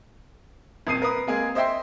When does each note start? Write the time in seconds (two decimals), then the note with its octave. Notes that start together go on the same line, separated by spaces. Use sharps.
0.87 D#1 F2 D#6 C7 D#7
1.02 A#4 B4 D#6
1.27 C3 G#3 A#3 G#4
1.55 C5 D#5 E5 G5 C6